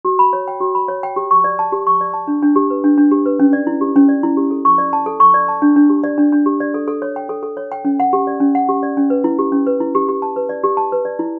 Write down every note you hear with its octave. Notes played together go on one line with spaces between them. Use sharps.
F#4
B5
C#5
G5
F#4
B5
C#5
G5
G4
C#6
D5
A5
G4
C#6
D5
A5
D4
D4
G4
B4
D4
D4
G4
B4
C#4
D5
E4
G4
C#4
D5
E4
G4
A4
C#6
D5
A5
A4
C#6
D5
A5
D4
D4
G4
D5
D4
D4
G4
D5
A4
A4
C#5
G5
A4
A4
C#5
G5
C#4
F#5
G4
D5
C#4
F#5
G4
D5
C#4
B4
E4
G4
C#4
B4
E4
G4
G4
A5
B4
D5
G4
A5
B4
D5
E4